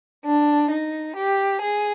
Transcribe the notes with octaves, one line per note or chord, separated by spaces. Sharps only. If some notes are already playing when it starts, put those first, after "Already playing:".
D4
D#4
G4
G#4